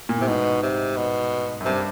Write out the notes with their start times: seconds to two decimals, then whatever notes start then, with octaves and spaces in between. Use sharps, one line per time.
0.09 A#2
0.18 A2 C3
0.28 G#2 B2
0.63 C3
0.97 B2
1.60 F#2
1.66 G2 C3